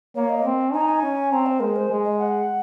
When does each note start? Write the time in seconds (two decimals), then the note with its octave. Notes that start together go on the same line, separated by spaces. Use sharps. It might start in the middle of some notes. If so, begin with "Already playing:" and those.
0.15 A#3 C#5
0.30 D#5
0.44 C4
0.74 D#4 G#5
0.81 A#5
0.89 G#5
1.03 C#4
1.32 C4 A#5
1.46 C5
1.60 G#3 A#4
1.76 C5
1.90 G#3
2.05 D#5
2.19 F#5